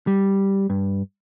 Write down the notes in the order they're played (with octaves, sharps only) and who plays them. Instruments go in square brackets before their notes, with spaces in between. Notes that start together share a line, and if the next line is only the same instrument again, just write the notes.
[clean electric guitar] G3
G2